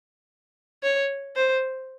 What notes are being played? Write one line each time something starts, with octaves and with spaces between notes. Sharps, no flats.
C#5
C5